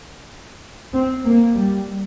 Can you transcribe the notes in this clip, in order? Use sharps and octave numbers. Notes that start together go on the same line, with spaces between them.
C4
A#3
G3